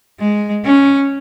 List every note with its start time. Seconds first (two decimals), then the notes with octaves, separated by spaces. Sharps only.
0.20 G#3
0.65 C#4